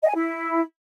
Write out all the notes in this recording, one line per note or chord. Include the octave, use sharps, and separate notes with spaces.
D#5
G#5
E4